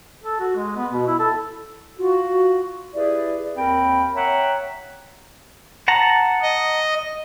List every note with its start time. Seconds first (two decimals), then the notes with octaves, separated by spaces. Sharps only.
0.24 A4
0.40 F#4
0.56 G#3
0.76 B3
0.92 B2
1.07 E4
1.19 A4
1.98 F4 F#4
2.94 E4 G4 G#4 B4 D5
3.57 D#2 C4 A#4 G5 B5
4.15 C#5 E5 F#5 G5 A#5
5.88 F#5 A5 A#5
6.42 D#5